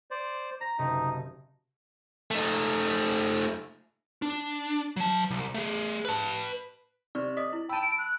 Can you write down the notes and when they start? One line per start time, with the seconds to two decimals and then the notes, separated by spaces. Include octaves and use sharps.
0.11 C5 D5
0.61 A#5 A#6
0.79 F#1 C3 D#4
2.31 A3 D#4
4.22 D4
4.96 F#3 A5
5.30 C2
5.54 A3 G#4
6.05 B4 A5
7.15 C3 D5 C#6 F6
7.37 D5 D#5 D#6 B6
7.53 E4
7.69 G5 A5 B5 E6 D#7
7.82 D7
7.98 F#6